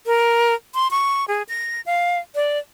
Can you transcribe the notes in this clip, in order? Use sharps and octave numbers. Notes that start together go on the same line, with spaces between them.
A#4
C6
C#6
G#4
A#6
F5
D5